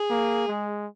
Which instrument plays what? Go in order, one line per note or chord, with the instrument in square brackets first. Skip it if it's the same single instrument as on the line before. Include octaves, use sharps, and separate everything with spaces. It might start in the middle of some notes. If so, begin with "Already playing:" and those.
Already playing: [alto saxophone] G#4
[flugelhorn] A#3
G#3